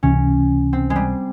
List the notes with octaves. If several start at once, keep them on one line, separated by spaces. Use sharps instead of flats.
C#2 C3 E3 C#4
C4
G#3
G3